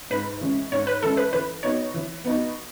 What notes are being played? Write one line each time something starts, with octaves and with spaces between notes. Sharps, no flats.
G#2 B4
E3 G#3 C#4 E4
G#2 C#5
B4
E3 G#3 C#4 E4 A4
B4
E3 B4
B3 D#4 F#4 C#5
E3
B3 D#4 F#4